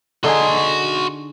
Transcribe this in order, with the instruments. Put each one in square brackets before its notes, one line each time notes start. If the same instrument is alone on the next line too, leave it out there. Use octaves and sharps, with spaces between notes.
[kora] D3 D#4 G#4 [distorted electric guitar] F#4 C6